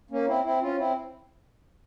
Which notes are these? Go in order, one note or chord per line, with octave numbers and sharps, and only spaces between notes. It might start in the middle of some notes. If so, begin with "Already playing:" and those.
A#3 C#4
C4 E4
C4 E4
C#4 F4
C4 E4